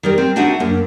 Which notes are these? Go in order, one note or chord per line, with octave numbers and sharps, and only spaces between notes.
D#3 G3 A#4
C4
D4 D#4 F#4 E5 G#5
F#2 A#3